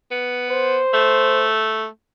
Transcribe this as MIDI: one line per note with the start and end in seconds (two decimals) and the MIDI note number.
0.11 0.79 59
0.50 1.49 72
0.94 1.86 57